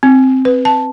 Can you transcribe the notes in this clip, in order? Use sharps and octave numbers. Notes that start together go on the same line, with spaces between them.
C4
B4
A5